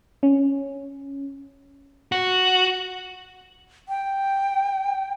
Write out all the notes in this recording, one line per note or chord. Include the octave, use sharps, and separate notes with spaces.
C#4
F#4
G5